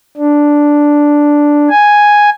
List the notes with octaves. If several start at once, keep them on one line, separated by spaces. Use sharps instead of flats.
D4
G#5